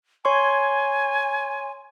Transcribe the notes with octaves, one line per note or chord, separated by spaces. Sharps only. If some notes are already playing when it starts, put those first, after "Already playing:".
C#5 G#5 C6 C#6